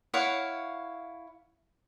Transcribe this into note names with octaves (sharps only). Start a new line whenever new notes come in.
E4 C#5 F5 F#5